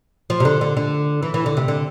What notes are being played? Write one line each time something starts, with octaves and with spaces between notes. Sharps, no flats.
F3
C3
D3
D3
D3
E3
E3
D3
C3
D3